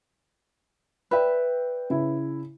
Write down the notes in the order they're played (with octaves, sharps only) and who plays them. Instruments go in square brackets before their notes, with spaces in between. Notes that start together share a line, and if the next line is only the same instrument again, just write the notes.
[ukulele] B4 E5 [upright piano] D5 G5
[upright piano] C#3 E4